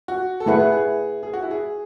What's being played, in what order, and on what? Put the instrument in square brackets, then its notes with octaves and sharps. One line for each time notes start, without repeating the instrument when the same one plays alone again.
[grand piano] F#4
A4
[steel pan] A3 E4 B4 F#5 [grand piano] G#4
[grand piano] G#4
G#4
G#4
F#4
E4
G#4